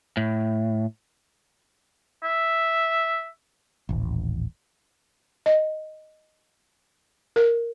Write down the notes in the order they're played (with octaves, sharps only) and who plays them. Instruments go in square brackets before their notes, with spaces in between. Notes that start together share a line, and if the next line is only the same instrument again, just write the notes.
[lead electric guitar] A2
[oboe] E5
[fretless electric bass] D#1 A1
[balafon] D#5
A#4